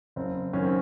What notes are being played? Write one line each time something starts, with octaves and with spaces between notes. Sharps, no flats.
F#1 C4
F#2 D#3 C#4
C4